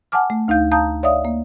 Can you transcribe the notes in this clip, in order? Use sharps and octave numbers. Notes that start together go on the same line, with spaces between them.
F#5 G#5 A5 D6 F6
A3
D2 D#4 F5 G6
F5 A5 A#5 D#6 G6
C#5 D5 E5 F5 D#6
A#3